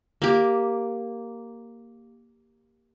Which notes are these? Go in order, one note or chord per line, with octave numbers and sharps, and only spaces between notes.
A#3 G4